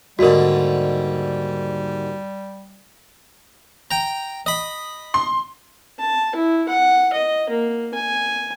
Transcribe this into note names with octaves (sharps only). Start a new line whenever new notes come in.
D#2 G#2 D3 G3 F#4 A#4
G5 A#5
D#5 B5
C6
A5
E4
F#5
D#5
A#3
G#5